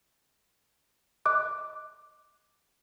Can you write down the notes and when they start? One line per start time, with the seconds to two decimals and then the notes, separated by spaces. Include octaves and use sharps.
1.25 D#5 D6 F#6